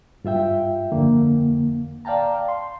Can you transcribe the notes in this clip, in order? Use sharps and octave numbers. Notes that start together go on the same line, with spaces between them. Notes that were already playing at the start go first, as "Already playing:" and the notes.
G2 F4 E5 G5
F2 D3 A#3
D5 F5 G5 A5 A#5
C6